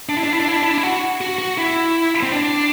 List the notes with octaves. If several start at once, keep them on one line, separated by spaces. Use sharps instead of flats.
D4
E4
D4
E4
D4
E4
D4
E4
D4
E4
F#4
F#4
F#4
E4
C4
D4